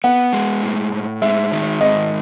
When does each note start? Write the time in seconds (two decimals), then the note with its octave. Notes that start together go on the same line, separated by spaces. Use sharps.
0.04 B3 F#5
0.33 G#3
0.62 A2
0.92 A2
1.22 G#3 E5
1.52 D#3
1.80 G#2 D#5